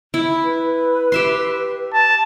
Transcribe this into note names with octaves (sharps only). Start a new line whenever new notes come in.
E4
B4
G4 E5 C6
A5